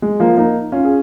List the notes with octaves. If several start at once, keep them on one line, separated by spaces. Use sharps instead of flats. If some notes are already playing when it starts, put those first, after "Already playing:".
G#3
F3 A#3
A#3 D#4
C#4 F4
G#4